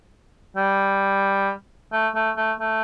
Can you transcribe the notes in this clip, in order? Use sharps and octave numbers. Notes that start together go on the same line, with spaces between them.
G3
A3
A3
A3
A3